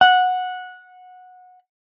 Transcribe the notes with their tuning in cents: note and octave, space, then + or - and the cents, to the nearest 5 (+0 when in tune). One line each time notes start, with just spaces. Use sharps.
F#5 -15